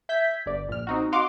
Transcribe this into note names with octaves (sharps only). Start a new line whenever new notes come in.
E5 G6 G#6 B6
G1 D5
A#1 F6
C4 D#4 F#4
F#4 D#5 F5 C6 D6